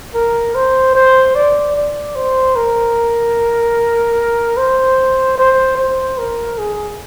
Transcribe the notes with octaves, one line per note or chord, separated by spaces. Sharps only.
A#4
C5
C5
D5
D5
C5
A#4
C5
C5
C5
A#4
G#4